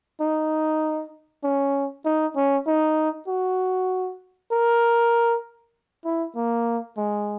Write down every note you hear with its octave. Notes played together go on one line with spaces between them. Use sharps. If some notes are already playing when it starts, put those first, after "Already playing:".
D#4
C#4
D#4
C#4
D#4
F#4
A#4
E4
A#3
G#3